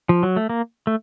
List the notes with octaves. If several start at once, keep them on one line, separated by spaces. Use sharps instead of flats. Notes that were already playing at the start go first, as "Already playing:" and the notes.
F3
F#3
A3
A#3
A3